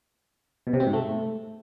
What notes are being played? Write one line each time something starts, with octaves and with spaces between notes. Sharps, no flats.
B2
C3
C4
G#2
A3